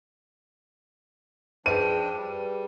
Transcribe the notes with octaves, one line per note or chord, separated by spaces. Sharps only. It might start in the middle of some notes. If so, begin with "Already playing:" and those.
F3 D4 G#4 B4 C5 G5 D#7
G3